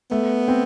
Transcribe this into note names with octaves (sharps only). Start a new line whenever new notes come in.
A3 B3
C4